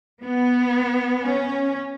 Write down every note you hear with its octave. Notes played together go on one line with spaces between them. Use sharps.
B3
C#4